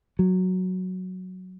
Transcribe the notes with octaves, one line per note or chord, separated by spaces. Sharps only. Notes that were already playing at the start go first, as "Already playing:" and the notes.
F#3